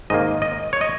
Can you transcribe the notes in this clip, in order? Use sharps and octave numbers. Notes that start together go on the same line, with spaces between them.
G#2 D#3 A#3 D#5
D#5
C#5
D#5